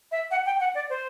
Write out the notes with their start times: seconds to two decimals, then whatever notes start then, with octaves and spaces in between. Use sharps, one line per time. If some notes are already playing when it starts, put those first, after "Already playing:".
0.12 E5
0.31 F#5
0.46 G5
0.60 F#5
0.75 D5
0.90 C5